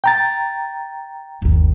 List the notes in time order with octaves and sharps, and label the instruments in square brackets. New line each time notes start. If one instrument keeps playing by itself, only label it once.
[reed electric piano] G5 A#5 A6
[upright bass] G1 D#2